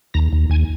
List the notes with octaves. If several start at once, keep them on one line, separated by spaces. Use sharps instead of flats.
D#2 A#5
D#2
D#2 G#5